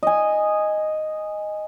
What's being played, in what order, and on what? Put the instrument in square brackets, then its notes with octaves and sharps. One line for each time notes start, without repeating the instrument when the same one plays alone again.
[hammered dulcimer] D#5 G#5